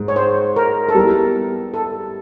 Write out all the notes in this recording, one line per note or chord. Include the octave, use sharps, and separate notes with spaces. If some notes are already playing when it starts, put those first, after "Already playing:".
Already playing: G#2
C#5
C5
A#4
A4
G3 B3 E4 A#4
A4